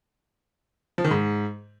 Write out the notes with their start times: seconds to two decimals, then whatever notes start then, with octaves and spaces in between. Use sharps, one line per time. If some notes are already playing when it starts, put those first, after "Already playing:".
0.98 F3
1.04 D#3
1.11 G#2